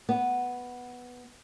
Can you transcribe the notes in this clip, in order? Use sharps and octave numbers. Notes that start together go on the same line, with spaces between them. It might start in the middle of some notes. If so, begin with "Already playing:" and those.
B3